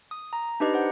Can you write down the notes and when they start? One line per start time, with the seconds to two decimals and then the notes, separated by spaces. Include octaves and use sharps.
0.11 D#6
0.33 A#5
0.60 D4 D#4 G4 B4 D#5
0.74 C5 F#5